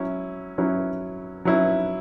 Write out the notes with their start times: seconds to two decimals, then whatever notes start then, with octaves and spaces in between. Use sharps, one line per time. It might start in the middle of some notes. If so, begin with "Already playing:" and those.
Already playing: F#3 C#4 E4
0.58 F#3 C#4 E4
1.45 F#3 C#4 E4